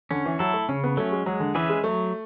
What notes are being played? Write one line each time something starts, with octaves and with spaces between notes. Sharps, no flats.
D3 C#4
E3
F#3 E4 A4
A3
C#3 C#4
B3
F#3 A3 C#4
G#3
F#3 G#3
D3
E3 C#4 G#4 B4 E5
G#3
F#3 A3